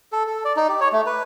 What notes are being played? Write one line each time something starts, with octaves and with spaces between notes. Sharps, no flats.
A4
A4
D5
D#4
G4
C#5
A3
B4